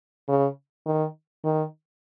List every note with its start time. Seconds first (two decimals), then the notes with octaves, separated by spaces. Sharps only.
0.28 C#3
0.86 D#3
1.45 D#3